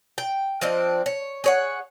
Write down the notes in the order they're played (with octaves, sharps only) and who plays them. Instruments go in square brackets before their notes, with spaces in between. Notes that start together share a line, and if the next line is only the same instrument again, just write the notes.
[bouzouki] G5
F3 C4 D4 D#5
C#5
G#4 C#5 F#5